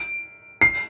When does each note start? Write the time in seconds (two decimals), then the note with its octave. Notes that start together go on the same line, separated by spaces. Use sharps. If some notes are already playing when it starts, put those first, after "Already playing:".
Already playing: D7
0.61 C7